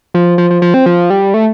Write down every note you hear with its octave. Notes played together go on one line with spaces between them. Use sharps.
F3
F3
F3
F3
C4
F3
G3
A3